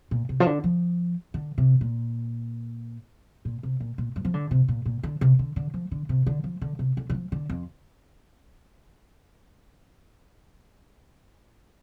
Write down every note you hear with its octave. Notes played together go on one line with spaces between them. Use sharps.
A#2
C3
F3
D3
F3
D3
C3
A#2
A#2
C3
A#2
A#2
G2
F3
D3
C3
A#2
A#2
D3
C3
D3
D3
F3
D3
C3
D3
F3
D3
C3
D3
D3
F3
D3
F2